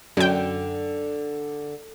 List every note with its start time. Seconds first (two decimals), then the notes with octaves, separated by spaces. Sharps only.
0.17 F#2 D3 G5